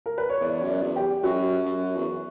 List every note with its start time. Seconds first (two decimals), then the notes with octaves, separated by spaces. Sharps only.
0.06 A#4
0.18 B4
0.30 C#5
0.41 E2 D5
0.62 F#2
0.69 D5
0.82 E2
0.96 G4
1.23 F#2 F#4
1.66 F#2
1.96 E2